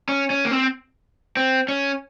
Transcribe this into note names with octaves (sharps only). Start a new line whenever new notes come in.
C#4
C#4
A#3
C4
C4
C#4